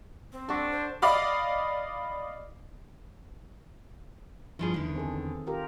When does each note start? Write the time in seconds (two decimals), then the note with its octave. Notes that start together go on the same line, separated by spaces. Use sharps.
0.32 C4
0.49 D4 F#4 A4
0.72 C5
1.02 D5 D#5 F5 B5 D6
4.59 G2 E3 F3 G#4
4.74 E2 D3 D#3
4.96 C4 G#4 A4
5.47 F4 G4 A#4